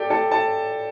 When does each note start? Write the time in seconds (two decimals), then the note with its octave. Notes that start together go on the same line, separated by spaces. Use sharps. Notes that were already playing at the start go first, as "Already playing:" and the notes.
Already playing: G4 A4 D5 G5
0.10 A4 A5
0.32 A4 A5